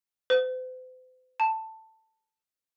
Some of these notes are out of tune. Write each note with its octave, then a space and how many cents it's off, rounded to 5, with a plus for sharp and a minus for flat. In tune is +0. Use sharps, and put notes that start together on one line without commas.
C5 -45
A5 +10